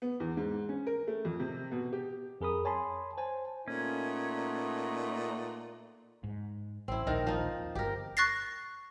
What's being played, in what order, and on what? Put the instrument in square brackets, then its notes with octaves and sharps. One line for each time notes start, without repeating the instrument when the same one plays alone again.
[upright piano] B3
E2
G#2
C#4
A#4
A3
F2
C3
B2
G4
[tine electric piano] F2 G#4 A#4 B5 D#6
C#5 G#5 A5 B5 C6
C5 G#5 A5
[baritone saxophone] A#2 [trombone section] A3 B3 D#4 [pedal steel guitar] C#4
[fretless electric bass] G#2
[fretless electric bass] A1 [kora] C4 E4
[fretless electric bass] A#1 D#2 [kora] D#3 D#4 A#4
[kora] F3 D#4
[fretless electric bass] G1 [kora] G4 A#4
[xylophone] C#6 F#6 A6 A#6 C7